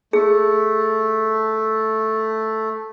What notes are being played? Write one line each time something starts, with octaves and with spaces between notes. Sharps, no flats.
A3 G#4